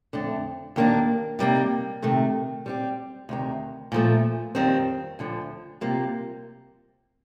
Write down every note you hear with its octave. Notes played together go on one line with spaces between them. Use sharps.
F2 D3 A3 D4
D#2 D#3 A#3 D4
C3 G3 A#3 D#4
C3 D#3 A3
G3 C4 G4
D2 C3 D#3
A#2 F3 A3
F2 D#3 G3 C4
D2 D3 F3
C3 G3 A#3 F4